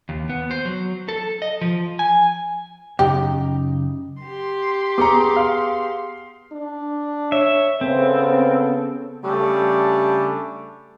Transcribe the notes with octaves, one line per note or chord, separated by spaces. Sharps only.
D#2
B3
C5
F#3
A4
D#5
F3
G#5
F#2 C#3 D#4 G4
G4 C6
B3 G#4 A#5 D6 C#7
F5
D4
C#5 E5
C#3 B3 C4 A4 C5
C#3 G3 A3 D4